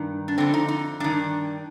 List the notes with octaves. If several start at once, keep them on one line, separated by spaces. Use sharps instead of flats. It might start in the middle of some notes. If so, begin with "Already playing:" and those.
Already playing: G2 D#3
D4
F2 D3 C4
D#4
D#4
G2 D#3 D4